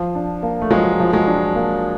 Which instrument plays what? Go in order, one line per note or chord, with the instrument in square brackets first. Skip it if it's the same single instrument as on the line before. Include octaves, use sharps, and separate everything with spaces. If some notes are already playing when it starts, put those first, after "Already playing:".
Already playing: [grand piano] F3
D4
A#3
[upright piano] A3
[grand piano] F3 [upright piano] F#3 G#3
[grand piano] F3
[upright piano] F#3 G#3
[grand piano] D4
A#3